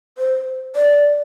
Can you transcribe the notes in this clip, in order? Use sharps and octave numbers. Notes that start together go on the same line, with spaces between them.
C5
D5